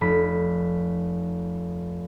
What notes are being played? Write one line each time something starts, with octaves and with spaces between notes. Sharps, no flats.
F1 B5